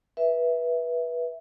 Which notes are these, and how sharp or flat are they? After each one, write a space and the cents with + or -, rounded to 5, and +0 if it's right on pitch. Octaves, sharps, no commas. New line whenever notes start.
B4 -20 E5 +0